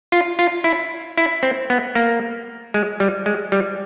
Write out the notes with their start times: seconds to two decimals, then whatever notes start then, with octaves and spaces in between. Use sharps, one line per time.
0.12 F4
0.39 F4
0.64 E4
1.17 E4
1.43 C4
1.70 B3
1.95 A#3
2.74 G#3
3.00 G3
3.26 G#3
3.52 G3